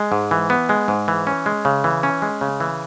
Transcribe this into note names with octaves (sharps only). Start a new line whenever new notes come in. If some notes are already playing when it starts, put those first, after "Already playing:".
Already playing: G#3
G#2
E3
B3
G#3
G#2
E3
C#4
G#3
C#3
E3
C#4
G#3
C#3
E3